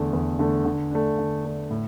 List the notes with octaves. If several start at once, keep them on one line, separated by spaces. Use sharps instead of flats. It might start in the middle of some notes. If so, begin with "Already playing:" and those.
Already playing: E2 D3 A3
E2
D3 A3
D3
A3 D4
D3
A3 D4
A2